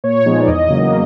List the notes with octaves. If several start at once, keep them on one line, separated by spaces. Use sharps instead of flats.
A#2 C#5
F3 G#3 B3 D#4
D5
E2 D#5
C#3 F#3 A#3